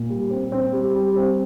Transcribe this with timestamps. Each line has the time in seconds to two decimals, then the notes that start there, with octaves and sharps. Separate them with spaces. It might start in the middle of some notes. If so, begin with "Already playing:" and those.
Already playing: A#2
0.09 G3
0.30 C4
0.52 C4
0.73 G3
0.95 G3
1.16 C4